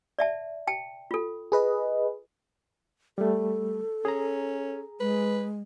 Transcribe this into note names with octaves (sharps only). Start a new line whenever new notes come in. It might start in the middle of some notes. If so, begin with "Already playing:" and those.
D5 E5 A5
G5 A5
F4 A4
G#4 B4 D#5
G3 A3 A4
C#4 G#4 A#5
G#3 B4